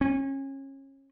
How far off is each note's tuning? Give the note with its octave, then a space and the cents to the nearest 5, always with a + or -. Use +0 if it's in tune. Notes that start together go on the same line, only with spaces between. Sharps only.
C#4 -30